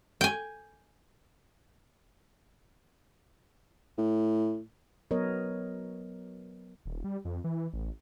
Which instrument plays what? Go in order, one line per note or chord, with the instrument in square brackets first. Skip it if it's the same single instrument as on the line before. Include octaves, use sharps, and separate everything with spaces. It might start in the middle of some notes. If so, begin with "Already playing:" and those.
[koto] G5 G#5
[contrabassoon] A2
[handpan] F#3 B3 A#4 C#5 D#5
[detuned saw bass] D#1
G3
F2
E3
A1